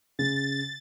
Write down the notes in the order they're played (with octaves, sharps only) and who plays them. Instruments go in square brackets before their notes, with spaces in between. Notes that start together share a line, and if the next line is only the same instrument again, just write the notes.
[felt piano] C#3 [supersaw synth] A6